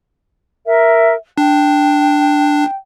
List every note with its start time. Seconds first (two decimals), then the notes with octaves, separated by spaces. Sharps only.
0.66 A#4 E5
1.38 D4 G5